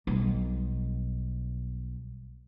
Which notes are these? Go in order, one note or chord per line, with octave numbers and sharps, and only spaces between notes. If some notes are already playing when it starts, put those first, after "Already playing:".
B1 G3